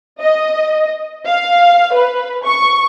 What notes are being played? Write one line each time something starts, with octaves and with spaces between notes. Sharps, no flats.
D#5
F5
B4
C#6